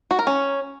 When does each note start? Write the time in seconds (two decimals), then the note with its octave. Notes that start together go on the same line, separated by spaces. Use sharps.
0.11 F#4
0.19 A#4
0.27 C#4